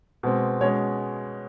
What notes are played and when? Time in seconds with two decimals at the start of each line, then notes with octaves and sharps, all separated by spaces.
0.23 B2 G#3 C4
0.61 B2 G#3 C#4 C#5